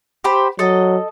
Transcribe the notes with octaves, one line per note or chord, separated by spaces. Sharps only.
G4 C5 B5
F#3 A4 D#5